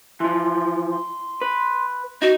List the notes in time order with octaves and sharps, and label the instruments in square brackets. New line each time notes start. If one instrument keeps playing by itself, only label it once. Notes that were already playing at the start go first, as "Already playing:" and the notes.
[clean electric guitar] E3 F3 [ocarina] C6
[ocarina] C6
[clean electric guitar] B4
[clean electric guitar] D#4 [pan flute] F#4